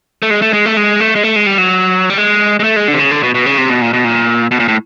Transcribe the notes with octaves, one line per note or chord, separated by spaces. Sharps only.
A3
G#3
A3
G#3
A3
G#3
A3
G#3
A3
G#3
G3
F#3
G3
G#3
G#3
A3
G#3
D3
C3
C#3
D3
B2
B2
C#3
C3
B2
A#2
B2
A#2
B2
A#2
A2